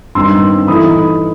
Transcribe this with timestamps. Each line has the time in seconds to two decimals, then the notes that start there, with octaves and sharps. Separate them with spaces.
0.15 G2 D#3 G3 C4 D#4 C6 E6
0.67 E3 A3 D#4 B5 D#6